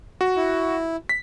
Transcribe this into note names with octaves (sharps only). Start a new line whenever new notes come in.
F#4
E4
B6